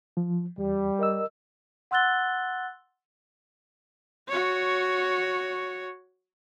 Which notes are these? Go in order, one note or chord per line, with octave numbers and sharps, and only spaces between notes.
F3
E2 G3
A#4 D#5 E6
F#5 C6 E6 F#6 A6 G7
F#4 C#5